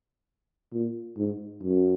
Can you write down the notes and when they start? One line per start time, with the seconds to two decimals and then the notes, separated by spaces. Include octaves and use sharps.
0.73 A#2
1.18 G#2
1.63 F#2